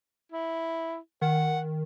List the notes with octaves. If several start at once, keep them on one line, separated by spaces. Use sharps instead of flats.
E4
D#3 F#5